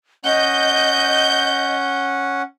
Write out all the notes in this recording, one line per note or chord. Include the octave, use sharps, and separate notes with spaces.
C#4 D#5 F#5 G6